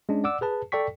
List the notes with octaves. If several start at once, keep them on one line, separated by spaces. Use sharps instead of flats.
G#3 C#4 D4
D5 F#5 D6 E6
G#4 B4 A5
A4 D5 G5 C#6 B6